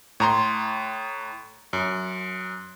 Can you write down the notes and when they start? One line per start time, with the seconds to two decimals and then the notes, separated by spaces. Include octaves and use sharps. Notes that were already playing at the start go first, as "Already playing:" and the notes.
0.20 A2 A#5 C6
1.73 F#2